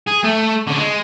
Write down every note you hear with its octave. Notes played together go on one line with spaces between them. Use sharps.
G#4
A3
D3 C#4
G#3